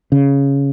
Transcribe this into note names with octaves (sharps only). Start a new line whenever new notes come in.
C#3